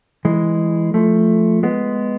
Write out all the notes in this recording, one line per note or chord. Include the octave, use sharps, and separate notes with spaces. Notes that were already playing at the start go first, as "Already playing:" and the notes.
E3 G#3
F3 A3
G#3 B3